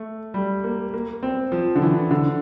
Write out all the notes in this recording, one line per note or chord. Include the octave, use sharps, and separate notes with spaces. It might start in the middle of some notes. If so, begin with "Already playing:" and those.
Already playing: A3
G3
A#3
A#3
C4
F3
D3
E3
D3